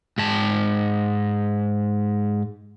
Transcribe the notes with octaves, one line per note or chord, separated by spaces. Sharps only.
G#2 A5